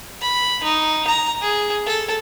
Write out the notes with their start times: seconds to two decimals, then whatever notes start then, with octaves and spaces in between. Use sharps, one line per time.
0.21 B5
0.63 D#4
1.07 A#5
1.42 G#4
1.86 A4